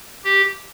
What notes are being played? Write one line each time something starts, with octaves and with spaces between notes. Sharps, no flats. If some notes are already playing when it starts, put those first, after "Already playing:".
G4